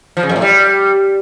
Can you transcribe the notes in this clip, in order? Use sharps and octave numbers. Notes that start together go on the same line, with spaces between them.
F3
C#3
F2
A2
G3